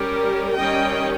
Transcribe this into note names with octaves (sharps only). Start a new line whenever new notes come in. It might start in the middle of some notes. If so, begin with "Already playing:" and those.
Already playing: G3 C#4 G4 A#4
D#3 G3 C#4 D#5 G5